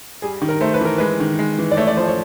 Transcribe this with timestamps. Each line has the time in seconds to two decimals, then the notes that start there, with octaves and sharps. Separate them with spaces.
0.22 G3 G#4
0.42 D#3
0.49 A#4
0.61 A3 C5
0.74 B4
0.81 E3 A#4
0.98 G#3 B4
1.20 D#3
1.39 G#3
1.59 E3
1.71 D5
1.77 A3 C#5
1.87 D5
1.97 F3 C5
2.07 C#5